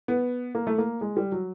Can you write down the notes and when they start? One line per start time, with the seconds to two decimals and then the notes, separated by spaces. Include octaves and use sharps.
0.08 B3
0.55 A#3
0.67 A3
0.78 A#3
1.01 G#3
1.17 G3
1.32 F#3